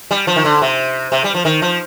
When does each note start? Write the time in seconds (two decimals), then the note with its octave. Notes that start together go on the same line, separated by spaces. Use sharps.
0.11 G3
0.27 F3
0.36 D#3
0.45 D3
0.62 C3
1.12 C3
1.24 G3
1.35 F3
1.45 D#3
1.62 F3